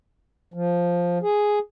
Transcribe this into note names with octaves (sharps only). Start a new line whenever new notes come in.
F3
G#4